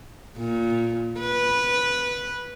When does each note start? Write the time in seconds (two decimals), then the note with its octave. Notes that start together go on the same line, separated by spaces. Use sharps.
0.38 A#2
1.20 B4